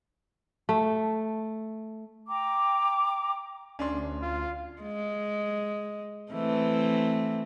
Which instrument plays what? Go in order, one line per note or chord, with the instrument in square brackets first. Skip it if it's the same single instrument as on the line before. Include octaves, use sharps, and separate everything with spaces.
[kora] A3
[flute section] G5 A#5 D6
[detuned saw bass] D2 [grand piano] C#4 D4 C6
[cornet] F4
[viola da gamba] G#3
E3 A3 C4